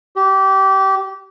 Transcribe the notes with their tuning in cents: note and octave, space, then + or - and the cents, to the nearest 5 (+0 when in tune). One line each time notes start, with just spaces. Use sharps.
G4 -25